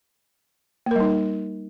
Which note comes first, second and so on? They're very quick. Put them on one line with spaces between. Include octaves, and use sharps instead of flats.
A#3 A#4 G3 D#4